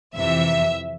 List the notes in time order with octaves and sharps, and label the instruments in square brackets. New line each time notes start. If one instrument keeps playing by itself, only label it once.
[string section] F2 C3 E3 E5